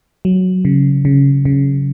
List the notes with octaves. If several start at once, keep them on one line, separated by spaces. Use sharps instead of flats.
F#3
C#3
C#3
C#3